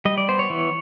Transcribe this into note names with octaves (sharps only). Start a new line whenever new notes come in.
G3 D#5
D5
B3 C5
C#5
E3